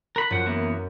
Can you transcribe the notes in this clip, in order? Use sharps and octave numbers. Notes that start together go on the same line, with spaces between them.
A#4 B5 F#6
F#2 F3 F#5
E3 A#3 B3